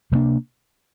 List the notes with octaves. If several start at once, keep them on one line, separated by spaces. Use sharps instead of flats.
C3 G3 A#3 D4